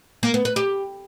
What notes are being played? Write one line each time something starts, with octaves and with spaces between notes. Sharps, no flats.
A#3
B3
B4
G4